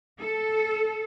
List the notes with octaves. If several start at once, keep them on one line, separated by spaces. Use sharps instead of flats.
A4